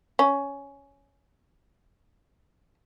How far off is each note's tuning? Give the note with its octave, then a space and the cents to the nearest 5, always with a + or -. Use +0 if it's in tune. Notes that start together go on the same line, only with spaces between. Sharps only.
C#4 +10